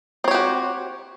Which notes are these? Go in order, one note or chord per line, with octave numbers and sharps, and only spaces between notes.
C4 F#4 G4 C#5